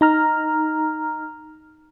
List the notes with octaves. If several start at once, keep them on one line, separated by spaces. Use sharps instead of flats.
D#4 A#5 F6